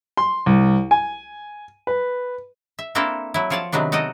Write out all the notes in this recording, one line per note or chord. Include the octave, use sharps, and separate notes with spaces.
C6
C2
G#5
B4
E5
A#3 C4 D4 E4 A4 A#4
F#3 E4
F3 F4 C#5 D5 A5
C3 D#3 F#3 B3 D4
D#4 F#4 A4 D5 D#5